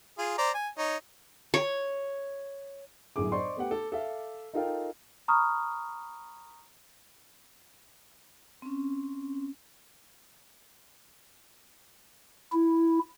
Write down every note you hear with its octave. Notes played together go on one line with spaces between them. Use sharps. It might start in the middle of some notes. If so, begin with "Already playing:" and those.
F4 G#4
C5 D5 A#5
G#5
D#4 C#5
C#5
G1 F#2 A2 G#4 D6
C5 D5 D#5 C6 C#6
A3 B3 G4 F#5
A4
A4 E5 F5
D#4 F4 A4 A#4 F5 G5
A#5 B5 C#6 D#6 F6
C4 C#4
E4